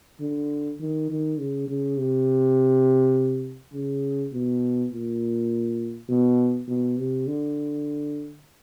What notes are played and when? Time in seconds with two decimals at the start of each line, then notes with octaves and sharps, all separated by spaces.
0.21 D3
0.80 D#3
1.10 D#3
1.39 C#3
1.68 C#3
1.98 C3
3.73 C#3
4.33 B2
4.92 A#2
6.09 B2
6.68 B2
6.98 C3
7.27 D3